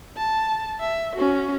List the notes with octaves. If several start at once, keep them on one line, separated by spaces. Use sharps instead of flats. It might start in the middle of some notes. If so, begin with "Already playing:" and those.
A5
E5
C#4 F#4